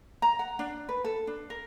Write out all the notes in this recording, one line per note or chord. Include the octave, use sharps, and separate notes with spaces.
A#5
F#5
D4
B4
A4
D4
A#4